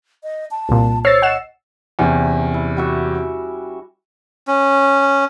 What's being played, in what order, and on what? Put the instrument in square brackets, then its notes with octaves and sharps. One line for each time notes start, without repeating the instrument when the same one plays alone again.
[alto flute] D#5
A5
[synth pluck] C2 A#2
[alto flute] C5 [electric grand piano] C#5 C7 [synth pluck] E6 A6
[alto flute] D#5 [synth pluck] F#5 E7
[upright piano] E2 C3 [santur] C#4
[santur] E4
G3 F#4 E5
[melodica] C#4